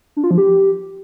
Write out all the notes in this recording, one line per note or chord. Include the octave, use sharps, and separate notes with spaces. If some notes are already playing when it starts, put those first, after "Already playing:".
D4
F4
F3
G4